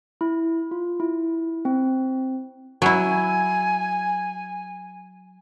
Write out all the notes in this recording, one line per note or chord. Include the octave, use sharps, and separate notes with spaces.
E4
F4
E4
C4
F#3 E4 G#5